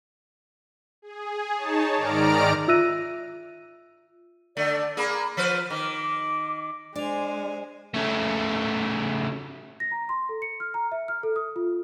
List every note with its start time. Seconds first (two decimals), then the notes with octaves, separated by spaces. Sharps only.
1.02 G#4
1.56 D#4 C#5 A5
1.96 G#2 D#3 D5 A#5 F6 D7
2.68 F4 E5 E6 F#6 A#6 D#7
4.57 D3 A3 D5
4.97 A#3 G#4 B5
5.37 F3 B4 C5 F6
5.70 D#3 D6
5.98 D6
6.96 G#3 D4 C5 D5 G#5 F7
7.94 C#3 A3
9.80 A#6
9.91 A#5
10.09 C6
10.29 A4
10.42 C#7
10.60 F6
10.74 A#5
10.92 E5
11.08 F6
11.23 A4
11.36 D#6
11.56 F4